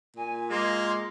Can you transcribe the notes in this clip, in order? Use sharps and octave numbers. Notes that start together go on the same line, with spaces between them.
A#2 G#5
G#3 A#3 C6